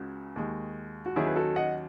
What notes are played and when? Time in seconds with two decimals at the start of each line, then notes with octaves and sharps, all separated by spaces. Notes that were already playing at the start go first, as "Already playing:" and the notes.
Already playing: C#2 C#3 G#3 F#4
0.36 D#2 D#3 G#3
1.06 F#4
1.16 D#2 D#3 F#3 C#4 E4 G#4
1.27 B4
1.36 F#4 A4
1.56 D#5 F#5